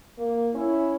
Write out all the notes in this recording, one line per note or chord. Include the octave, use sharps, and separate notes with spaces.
A#3
C#4 E4